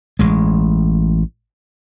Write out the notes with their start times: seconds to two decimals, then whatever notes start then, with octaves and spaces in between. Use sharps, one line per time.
0.19 A1 G#3